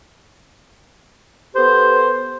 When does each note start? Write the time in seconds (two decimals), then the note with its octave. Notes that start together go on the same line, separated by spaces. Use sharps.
1.55 B3 G4 A4 C5